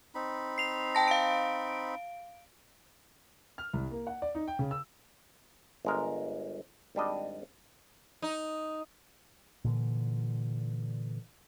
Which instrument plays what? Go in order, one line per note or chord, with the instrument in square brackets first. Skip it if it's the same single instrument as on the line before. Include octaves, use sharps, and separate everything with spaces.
[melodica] C4 D#4 B5
[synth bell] C7 F7
G5 A5 A#6
F5 D7
[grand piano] F6
C2
A#3
F#5
D5
D#4
G5
C#3
E6
[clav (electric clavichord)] G1 G#3 A#4
G#1 G3 D4 D#5
[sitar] D#4
[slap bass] A#2 D3 E3